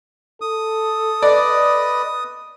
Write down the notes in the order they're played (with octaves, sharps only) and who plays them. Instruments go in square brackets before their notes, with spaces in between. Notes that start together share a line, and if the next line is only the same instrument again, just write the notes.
[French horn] A4 [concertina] D#6
[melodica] B4 D#5 [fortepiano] D5